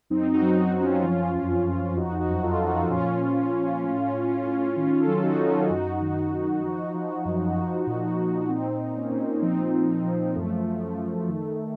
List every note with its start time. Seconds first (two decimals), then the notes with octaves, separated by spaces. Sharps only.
0.10 F#2 C4 D#4
0.34 D#4 F#4
0.42 F#3
0.57 D#4 F#4
0.73 F#2 D#4
0.80 C#4 F4
1.04 F3 C#4 F4
1.35 F2
1.66 F2
1.97 F3 D#4 F#4
2.20 D#4 F#4
2.28 F#2
2.43 F4 A4
2.59 F3
2.67 D#4 F#4
2.90 A#2 C#4 F4
3.21 A#2
3.52 F3
3.84 A2
4.15 A2
4.45 A2
4.77 D#3 C#4 F4
5.00 F4 A4
5.07 F#3
5.23 D#4 F#4
5.39 F#3 D#4
5.46 C#4 F4
5.69 F#2 D#4 F#4
6.01 D#3
6.32 D#3
6.63 F3
6.94 F3
7.25 F#2
7.56 F3
7.87 A#2
8.18 A#2
8.49 A#2 C4 D#4
8.80 A#2
8.96 A#3 C#4
9.11 A#2
9.42 F3 C4 D#4
9.74 F3
10.04 F3
10.35 F#2 A3
10.67 F#2
10.97 F#2
11.29 D#3